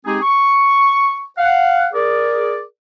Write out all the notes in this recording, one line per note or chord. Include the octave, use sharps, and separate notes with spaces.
G#3 C4 D#4 G4 G#4
C#6
F5 F#5
G#4 A#4 D5